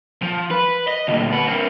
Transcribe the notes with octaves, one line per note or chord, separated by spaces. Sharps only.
F3
B4
D#5
D2 A#2
F#4 B4
A#3 C4